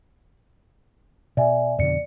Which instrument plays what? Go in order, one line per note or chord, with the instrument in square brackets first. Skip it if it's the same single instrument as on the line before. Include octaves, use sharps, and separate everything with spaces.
[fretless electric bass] B2 [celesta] D5 E5 G#5
[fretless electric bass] F2 B2 D3 [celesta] D5 C#7